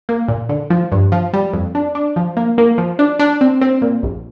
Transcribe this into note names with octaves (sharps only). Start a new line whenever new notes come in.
A#3
A#2
D3
F3
G2
F3
G3
F2
D4
D4
F3
A#3
A#3
F3
D4
D4
C4
C4
A#2
A#1